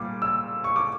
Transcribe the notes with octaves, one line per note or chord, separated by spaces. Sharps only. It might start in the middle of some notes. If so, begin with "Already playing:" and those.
Already playing: A#2 G3 D6
E6
C#6
D6